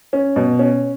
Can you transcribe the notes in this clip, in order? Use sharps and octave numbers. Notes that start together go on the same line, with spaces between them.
C#4
B2
C#4